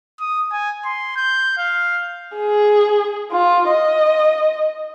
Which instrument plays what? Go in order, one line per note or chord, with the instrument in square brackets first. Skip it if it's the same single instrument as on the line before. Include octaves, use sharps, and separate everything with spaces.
[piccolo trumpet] D#6
G#5
C6
G6
F5
[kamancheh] G#4
F4
D#5